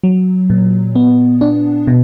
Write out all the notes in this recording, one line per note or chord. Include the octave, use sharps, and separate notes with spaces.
F#3
A#2
B3
D4
B2